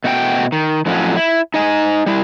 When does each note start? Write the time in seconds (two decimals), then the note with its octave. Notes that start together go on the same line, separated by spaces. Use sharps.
0.04 B2 A3 F#4 C#5 G5
0.52 D#3
0.86 F2 A2 F3 F#3 C#4
1.17 E4
1.54 D#4 D#5 G#5
2.06 G3 E4